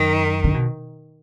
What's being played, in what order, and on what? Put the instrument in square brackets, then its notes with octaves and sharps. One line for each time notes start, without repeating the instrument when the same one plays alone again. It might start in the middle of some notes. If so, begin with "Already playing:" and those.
Already playing: [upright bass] F#2 [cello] D#3
[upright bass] D3
B2